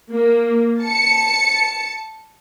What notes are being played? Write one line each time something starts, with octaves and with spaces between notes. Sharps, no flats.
A#3
A5 C#7